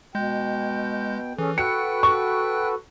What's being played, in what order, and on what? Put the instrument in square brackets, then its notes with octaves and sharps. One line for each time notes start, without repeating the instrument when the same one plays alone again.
[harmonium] B2 G5 [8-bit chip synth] G#3 G6
[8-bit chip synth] E3 [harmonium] C#4 G#4 A4
[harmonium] F#4 A4 B4 [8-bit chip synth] G5 F#6 [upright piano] C#7
[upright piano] C#6